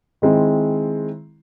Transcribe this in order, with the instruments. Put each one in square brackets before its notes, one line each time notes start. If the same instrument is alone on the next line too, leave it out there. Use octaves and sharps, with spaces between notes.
[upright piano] D#3 G#3 C4 E4